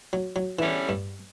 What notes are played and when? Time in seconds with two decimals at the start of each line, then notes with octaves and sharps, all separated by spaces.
0.13 F#3
0.36 F#3
0.58 E2 D3 E3 G3 C#4 E4
0.89 G2